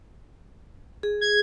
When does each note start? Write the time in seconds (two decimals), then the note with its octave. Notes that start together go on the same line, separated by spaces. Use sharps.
1.03 G#4
1.21 G#6